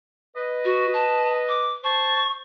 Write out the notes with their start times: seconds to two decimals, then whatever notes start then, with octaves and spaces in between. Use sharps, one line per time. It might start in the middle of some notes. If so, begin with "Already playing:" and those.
0.35 B4 D#5
0.65 F#4
0.94 A5
1.49 D6
1.84 C5 A5 C#6